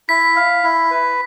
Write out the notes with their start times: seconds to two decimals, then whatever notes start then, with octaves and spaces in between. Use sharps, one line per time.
0.09 E4 B6
0.36 F5
0.64 E4
0.91 B4